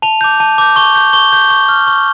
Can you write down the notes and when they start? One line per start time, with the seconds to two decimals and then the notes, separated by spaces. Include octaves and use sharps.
0.02 A5 F7
0.21 D6 G6
0.40 A5
0.58 D6 G6
0.76 C#6 G7
0.95 G6
1.13 C#6 G7
1.32 G6
1.50 C#6
1.69 F6
1.87 C#6